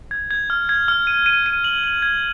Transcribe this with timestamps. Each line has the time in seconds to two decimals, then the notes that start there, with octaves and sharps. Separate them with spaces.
0.11 G#6
0.31 G#6
0.50 F6
0.69 G#6
0.88 F6
1.07 D#7
1.26 D#7
1.46 D#7
1.64 F#7
1.84 F#7
2.02 G#6